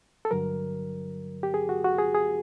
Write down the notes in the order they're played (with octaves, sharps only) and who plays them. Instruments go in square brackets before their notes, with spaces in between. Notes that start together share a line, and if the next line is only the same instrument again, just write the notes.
[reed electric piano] A4
G2 D3 F#3 A#4
G4
G#4
F#4
F#4
G#4
G#4